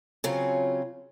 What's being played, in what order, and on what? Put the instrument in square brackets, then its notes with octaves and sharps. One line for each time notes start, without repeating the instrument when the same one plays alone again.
[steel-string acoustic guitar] C#3 F#3 C4 C#4 F4